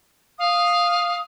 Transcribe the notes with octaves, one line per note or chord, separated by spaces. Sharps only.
F5 D#6